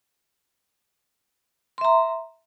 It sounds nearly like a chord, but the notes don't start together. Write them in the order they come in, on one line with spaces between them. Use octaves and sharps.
C6 E5 A#5